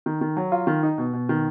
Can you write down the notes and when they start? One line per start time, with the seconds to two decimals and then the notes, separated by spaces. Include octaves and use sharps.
0.06 D#3
0.21 D#3
0.37 F#3
0.52 F4
0.67 D#3
0.83 D#4
0.98 B2
1.13 B2
1.29 D#3